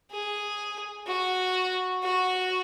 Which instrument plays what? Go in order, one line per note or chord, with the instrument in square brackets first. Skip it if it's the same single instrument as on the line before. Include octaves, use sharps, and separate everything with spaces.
[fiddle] G#4
F#4
F#4